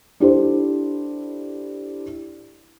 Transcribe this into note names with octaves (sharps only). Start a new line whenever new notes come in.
D4 E4 G4 A4 C5